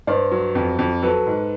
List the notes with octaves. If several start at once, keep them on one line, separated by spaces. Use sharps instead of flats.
G2 C5 D5
F#3
F2
F2
F#3 A4 B4
G#2